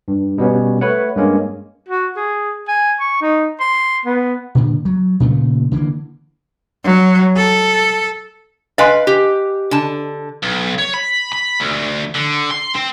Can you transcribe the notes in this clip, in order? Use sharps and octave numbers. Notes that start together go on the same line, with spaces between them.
G2
B2 G3 B3 C#4
A3 B4 C#5 F#5
G2 G#3 A#3 C#4
F#4
G#4
G#5
C#6
D#4
C6
B3
A#2 D3
F#3
A#2 C#3 F3 A3
D3 E3 G3 A#3
F#3
A4
B4 D#5 F5 G#5 C6
G4
D3 A5
B1
C#5
B5
B5
D2
D3
C6
C4